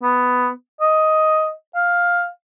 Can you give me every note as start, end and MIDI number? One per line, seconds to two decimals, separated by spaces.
0.02 0.50 59
0.81 1.51 75
1.75 2.28 77